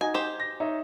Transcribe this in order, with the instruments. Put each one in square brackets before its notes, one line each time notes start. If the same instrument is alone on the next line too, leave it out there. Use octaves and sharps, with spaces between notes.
[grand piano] D#4 F#4 D#5 [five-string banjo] G#5
[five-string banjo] G4 C5
[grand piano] A#6
D#4 C#5 E5